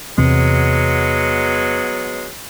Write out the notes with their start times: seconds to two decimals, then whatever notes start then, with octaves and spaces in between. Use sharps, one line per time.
0.18 E2 C3 F#3 G#3 B3 C4